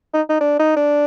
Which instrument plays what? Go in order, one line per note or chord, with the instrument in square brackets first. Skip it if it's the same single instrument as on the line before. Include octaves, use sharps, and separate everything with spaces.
[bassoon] D#4
D#4
D4
D#4
D4